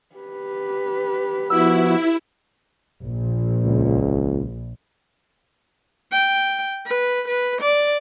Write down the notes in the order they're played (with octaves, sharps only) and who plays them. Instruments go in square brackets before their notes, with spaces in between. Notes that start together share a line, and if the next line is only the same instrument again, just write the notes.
[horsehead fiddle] G4 B4
[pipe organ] F3 B3 F#4 [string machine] E4 [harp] E6
[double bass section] A#1
[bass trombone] C#2
[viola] G5
B4
B4
D5